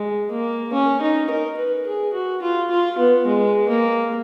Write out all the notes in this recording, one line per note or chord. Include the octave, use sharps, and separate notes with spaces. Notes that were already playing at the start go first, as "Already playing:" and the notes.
Already playing: G#3
A#3
C#4
D#4
A#4
B4
G#4
F#4
F4
F4
B3
G#3
A#3